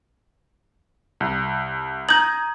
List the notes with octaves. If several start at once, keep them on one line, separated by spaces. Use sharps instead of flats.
C2
A#5 D#6 G6 G#6 F#7